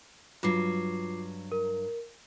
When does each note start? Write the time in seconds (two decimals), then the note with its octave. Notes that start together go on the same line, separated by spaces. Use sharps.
0.43 G2 F#3 F4 D6 C7
1.52 A#4